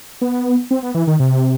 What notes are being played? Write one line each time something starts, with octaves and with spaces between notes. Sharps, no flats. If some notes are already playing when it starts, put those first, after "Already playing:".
B3
C4
B3
E3
D#3
C3